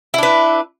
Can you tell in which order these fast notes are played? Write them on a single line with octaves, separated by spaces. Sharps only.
E4 D4 B4